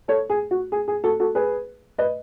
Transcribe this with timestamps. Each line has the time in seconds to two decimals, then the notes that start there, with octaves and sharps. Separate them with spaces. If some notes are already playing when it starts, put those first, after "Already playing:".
0.08 A4 C#5
0.30 G#4
0.51 F#4
0.72 G#4
0.88 G#4
1.04 F#4 A4
1.20 F#4 A4
1.35 G#4 B4
1.98 B4 D#5